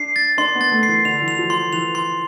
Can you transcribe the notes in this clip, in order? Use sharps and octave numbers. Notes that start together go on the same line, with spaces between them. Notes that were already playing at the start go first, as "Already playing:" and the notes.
Already playing: D4 C7
A6
D4 C6
B3
A6
A3
C7
E3
D3 F7
E3
F7
F3
C6
E3 F7
C6